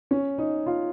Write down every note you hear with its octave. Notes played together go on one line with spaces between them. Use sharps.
C#4
D#4
F4